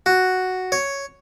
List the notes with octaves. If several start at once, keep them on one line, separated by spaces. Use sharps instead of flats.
F#4
C#5